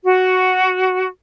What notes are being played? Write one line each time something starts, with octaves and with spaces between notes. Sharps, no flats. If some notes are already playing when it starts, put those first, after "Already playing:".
F#4